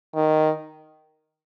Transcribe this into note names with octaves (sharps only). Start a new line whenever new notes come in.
D#3